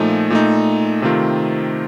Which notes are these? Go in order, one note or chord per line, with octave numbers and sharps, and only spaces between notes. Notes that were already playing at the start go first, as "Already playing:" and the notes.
Already playing: A#2 F3 A3 D#4
A#2 A3 D#4
C3 D#3 A3 C4 F4